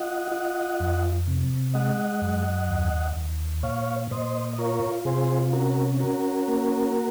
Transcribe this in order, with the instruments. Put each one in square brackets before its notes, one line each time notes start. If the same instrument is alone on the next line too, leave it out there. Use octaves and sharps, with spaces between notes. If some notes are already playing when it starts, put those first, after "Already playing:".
Already playing: [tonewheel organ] F4 D#5 F#5
F4
F2
C3
G#3 D#5 F#5
F#2
D#2
D#2
A#2 C#5 F5
A#2 C5 D#5
D#5
F4 A#4 C#5
C3 G#4 C5
C#4 F#4 A#4
C#4 F#4 A#4
A#3